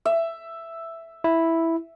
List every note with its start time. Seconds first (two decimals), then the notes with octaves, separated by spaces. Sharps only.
0.05 E5
1.24 E4